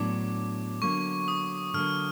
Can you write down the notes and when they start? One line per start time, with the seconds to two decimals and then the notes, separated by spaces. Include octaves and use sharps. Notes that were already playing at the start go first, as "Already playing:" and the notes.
Already playing: A2 F#3 B3 D4 D6
0.82 D3 F#3 A#3 C#6
1.28 D#6
1.74 D3 F#3 A#3 F6